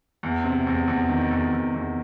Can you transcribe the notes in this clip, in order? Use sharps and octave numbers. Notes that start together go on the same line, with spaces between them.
E2
C3
E2
E2
D#3
E2
E2
E2